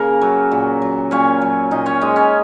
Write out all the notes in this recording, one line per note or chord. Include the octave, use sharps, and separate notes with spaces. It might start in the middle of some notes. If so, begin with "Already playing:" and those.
Already playing: C#3 A#3 A#4
F#3
A#2
F#3
A#2 C#4 C#5
F#3
A#2 D#4 D#5
C#4 C#5
G#3 D#4 D#5
C#4 C#5